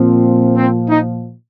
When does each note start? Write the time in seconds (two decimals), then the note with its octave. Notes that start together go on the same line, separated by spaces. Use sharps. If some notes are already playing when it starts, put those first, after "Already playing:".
Already playing: A#2 F3 C4
0.57 C4
0.89 D#4